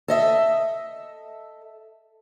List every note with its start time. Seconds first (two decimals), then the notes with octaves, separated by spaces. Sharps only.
0.08 A4 D#5 E5